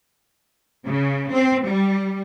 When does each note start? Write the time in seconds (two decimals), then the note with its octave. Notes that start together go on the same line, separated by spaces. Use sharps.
0.85 C#3
1.30 C4
1.64 G3